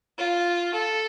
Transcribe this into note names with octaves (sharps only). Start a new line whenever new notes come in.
F4
A4